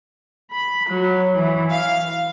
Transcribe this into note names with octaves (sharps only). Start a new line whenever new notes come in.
B5
F#3
E3
F5